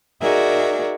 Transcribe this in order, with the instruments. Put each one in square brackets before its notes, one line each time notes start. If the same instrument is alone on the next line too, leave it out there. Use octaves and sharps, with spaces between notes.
[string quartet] D#4 F#4 G#4 A#4 D5 E5